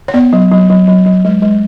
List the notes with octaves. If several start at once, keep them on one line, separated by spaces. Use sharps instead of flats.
C#5
B3 D5
F#3
F#3
F#3
F#3
F#3
G#3
G#3